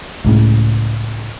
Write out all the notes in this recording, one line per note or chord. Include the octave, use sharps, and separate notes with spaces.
C#2 A2 C#3